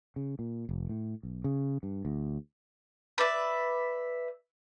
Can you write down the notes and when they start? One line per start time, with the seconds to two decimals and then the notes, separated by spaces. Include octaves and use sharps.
0.16 C#3
0.39 A#2
0.69 F1
0.89 A2
1.23 B1
1.44 C#3
1.83 G2
2.05 D2
3.18 B4 D5 E5